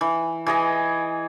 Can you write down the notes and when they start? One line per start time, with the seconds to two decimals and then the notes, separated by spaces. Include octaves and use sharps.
0.01 E3
0.46 E3 G#4 D#5